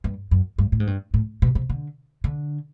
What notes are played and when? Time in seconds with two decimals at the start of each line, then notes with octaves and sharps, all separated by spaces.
0.04 G2
0.31 F#2
0.59 G2
0.72 A2
0.80 G#2
0.87 G2
1.14 A2
1.42 B2
1.55 C3
1.70 D3
2.24 D3